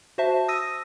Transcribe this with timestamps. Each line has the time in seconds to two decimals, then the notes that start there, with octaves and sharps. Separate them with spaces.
0.18 F#4 C5 E5 A5
0.48 D#6 E6 A#6 D#7